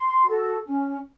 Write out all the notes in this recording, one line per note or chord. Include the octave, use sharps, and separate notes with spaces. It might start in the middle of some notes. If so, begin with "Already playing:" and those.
Already playing: C6
F#4 A4
C#4